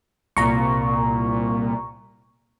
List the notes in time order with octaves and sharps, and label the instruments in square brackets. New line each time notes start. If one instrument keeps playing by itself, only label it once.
[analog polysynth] C2 A#2 [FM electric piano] A#5 C#6